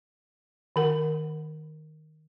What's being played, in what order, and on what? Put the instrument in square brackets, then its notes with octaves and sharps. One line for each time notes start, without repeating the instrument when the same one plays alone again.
[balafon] D#3 A#4 F#5